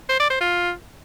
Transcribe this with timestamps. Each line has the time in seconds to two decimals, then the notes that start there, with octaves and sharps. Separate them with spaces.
0.09 C5
0.20 D5
0.30 C5
0.41 F4